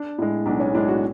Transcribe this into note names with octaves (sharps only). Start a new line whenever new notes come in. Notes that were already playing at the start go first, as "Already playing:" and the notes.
Already playing: D4
A2 G#3
B1 D4
C#4
A2 G#3 D4
F#4